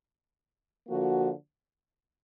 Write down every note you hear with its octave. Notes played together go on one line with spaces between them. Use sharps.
D3 F3 A#3 F#4